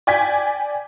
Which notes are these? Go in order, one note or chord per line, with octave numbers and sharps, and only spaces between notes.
D5 G5 G#5 G6 G#6 B6